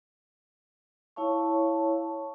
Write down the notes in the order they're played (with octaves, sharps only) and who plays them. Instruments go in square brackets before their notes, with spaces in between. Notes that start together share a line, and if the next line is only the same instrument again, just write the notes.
[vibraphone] E4 C#5 F5 A5 C#6